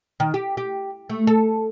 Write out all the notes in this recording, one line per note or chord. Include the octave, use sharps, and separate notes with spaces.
D#3
G4
G4
A3
A4